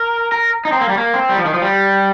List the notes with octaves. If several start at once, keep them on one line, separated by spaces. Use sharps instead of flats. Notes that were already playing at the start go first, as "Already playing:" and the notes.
Already playing: A#4
A#4
D#4
C4
A#3
G3
A#3
C4
G3
F3
D#3
F3
G3